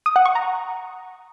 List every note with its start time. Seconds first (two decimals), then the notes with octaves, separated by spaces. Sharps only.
0.06 D#6
0.16 F#5
0.26 C#6
0.35 A#5